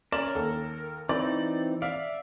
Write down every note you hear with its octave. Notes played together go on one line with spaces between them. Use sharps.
C#4 A#4 D5 E7
D#2 A4
E3 C4 D#4 D5
D5 E5 F5